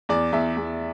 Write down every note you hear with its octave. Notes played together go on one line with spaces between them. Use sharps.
E2 D5
E2 E5
E2